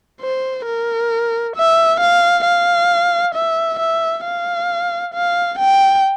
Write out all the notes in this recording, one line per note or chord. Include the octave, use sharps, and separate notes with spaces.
C5
A#4
E5
F5
F5
E5
E5
F5
F5
G5